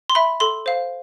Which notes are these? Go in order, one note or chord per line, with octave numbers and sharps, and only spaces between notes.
C6
E5 B5
A4 C6
C5 F5